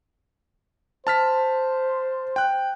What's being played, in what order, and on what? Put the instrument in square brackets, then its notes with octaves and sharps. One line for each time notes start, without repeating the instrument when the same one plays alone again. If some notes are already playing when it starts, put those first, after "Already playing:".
[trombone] C5 [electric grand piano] A5 F6 B6
[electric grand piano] G5 F#6